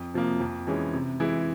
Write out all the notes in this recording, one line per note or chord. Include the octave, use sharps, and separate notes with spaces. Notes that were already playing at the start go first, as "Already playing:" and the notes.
Already playing: F2
C3 F3 A#3
F2
E3 G#3 C#4
C3
E3 G#3 E4